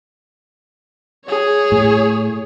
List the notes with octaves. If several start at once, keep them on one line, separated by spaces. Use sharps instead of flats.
G#4 C#5
A2